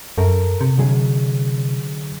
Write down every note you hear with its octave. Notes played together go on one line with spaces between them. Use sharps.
F#2 A4 A#4
C3
D3 F#3 G#4